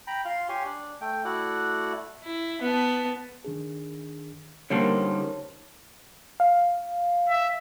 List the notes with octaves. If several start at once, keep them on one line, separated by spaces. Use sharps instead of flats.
G5 A#5 B5
F4 F5 C6
G4 C#5 G#5 C6
D4
A3 G5
A3 E4 F#4 D5 F#5
E4
B3 A5
D#3 D4 G#4
C#2 D3 D#3 G3 A#3 C5 C#5 A5
F5
E5